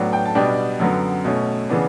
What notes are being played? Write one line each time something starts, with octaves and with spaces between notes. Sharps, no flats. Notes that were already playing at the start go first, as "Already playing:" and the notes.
Already playing: A2 F#3 B3 D4
G5
A5
B2 G3 B3 D4 G5
F#2 D3 F#3 B3
B2 A3 C#4
C#3 E3 B3 D4